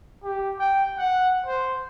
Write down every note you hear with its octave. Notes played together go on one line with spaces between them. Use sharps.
G4
G5
F#5
C5